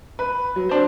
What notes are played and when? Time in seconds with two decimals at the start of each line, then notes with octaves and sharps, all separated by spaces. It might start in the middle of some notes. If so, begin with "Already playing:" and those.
0.19 B4
0.56 F#3
0.69 C4 D4 C5